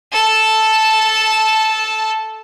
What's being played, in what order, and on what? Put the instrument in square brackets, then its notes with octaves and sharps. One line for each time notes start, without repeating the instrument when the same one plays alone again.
[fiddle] A4 A5